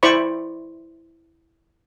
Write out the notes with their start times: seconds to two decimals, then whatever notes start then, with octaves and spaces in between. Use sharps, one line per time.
0.03 E4 C5 D5 B5 C#6